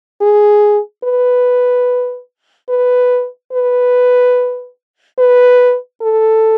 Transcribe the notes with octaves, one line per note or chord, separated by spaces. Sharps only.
G#4
B4
B4
B4
B4
A4